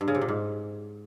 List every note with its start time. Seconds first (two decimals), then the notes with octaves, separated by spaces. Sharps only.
0.01 G2
0.08 C#3
0.15 C3
0.21 A#2
0.28 G#2